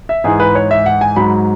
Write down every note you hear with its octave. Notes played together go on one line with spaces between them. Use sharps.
E5
G#2 E3 G#3 G#4
B4
C#5
E5
F#5
G#5
G#2 F#3 B5